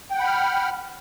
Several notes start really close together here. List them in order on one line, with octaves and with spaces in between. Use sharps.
G5 F#5 B5 F6